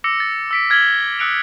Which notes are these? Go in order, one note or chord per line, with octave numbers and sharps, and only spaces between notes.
D6 E6 A#6 C#7
A6
E6 B6 D7
F6 G#6 A6 B6 F#7 G7
D#6 E6 F#6 C#7 D7 F7